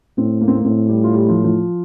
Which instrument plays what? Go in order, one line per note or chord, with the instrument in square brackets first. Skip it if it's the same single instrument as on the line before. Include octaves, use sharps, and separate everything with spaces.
[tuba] A2 [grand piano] C4
[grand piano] A#3
C4
A#3
[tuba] A2 [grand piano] C4
[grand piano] G3 G4
F4
G3 G4
F3 F4
F3 F4